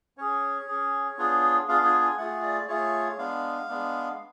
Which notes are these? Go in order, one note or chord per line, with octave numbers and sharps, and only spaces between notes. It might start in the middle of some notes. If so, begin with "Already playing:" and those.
C#4 G#4 C#5
C#4 G#4
B3 D4 F4 G#4
B3 D4 F4 G#4 F5
G#5
G#5
A3 F4 G#4 F#5
D5
A3 F4 G#4 C#5
G#3 B3 D4 F5
G#3 B3 D4